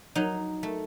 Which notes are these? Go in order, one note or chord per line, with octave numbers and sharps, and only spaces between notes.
F#3 D#4
A3